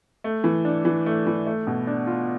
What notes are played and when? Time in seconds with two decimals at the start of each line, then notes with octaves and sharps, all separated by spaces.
0.24 A3
0.44 E3
0.65 D4
0.85 E3
1.06 A3
1.27 E3
1.47 A3
1.67 B2
1.87 D4
2.07 F4